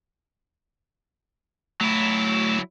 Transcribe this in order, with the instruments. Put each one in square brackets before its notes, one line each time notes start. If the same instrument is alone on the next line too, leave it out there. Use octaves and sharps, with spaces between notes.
[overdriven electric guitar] F#3 E4 [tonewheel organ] A3